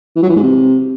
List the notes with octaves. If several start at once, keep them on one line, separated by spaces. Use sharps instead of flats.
E3
F#3
E3
G#2
C3